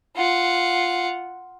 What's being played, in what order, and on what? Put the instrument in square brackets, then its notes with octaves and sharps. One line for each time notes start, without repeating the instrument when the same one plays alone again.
[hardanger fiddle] F4 F#5